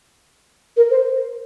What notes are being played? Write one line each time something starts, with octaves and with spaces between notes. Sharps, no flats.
A#4
C5